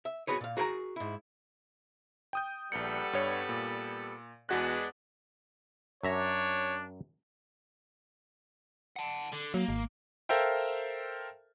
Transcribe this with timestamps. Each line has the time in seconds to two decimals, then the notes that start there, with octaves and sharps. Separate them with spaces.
0.05 E5
0.27 B3 C#4 F#4 G#4 B4 C#5
0.41 A#2 F5
0.57 F#4 G#4 A#4 G5 A#5
0.96 G#2 E4
2.33 G5 D#6 G6
2.72 A#1 G3 B3 A4 C#7
3.13 G2 C#5
3.49 A#2
4.49 E2 G#3 B3 D4 F#4 F#6
6.04 F#2 D4 C#5 E5 A#5
8.96 F#5 A5
9.33 D3
9.54 F#3 A#3
9.68 G#1
10.29 A4 A#4 C5 E5 F5 G5